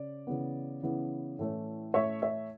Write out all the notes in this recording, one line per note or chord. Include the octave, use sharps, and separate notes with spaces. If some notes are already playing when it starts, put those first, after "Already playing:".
Already playing: C#3 D5
C#3 E3 B3
C#3 E3 B3
A2 E3 A3 C#4
A2 E3 A3 C#4 C#5 E5
C#5 E5